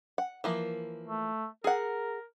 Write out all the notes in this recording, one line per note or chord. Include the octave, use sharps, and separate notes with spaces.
F#5
E3 F3 A#3
A3
G#4 A#4 F#5